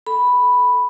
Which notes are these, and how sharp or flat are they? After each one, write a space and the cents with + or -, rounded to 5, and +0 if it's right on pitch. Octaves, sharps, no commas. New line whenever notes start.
A4 +0 B5 +0